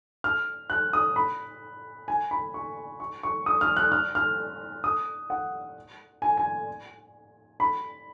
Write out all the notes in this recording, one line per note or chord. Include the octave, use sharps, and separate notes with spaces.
F6
F#6
D#6
B5
G#5
B5
C#6
C#6
C#6
D#6
F6
F#6
F6
F6
D#6
F#5
G#5
G#5
B5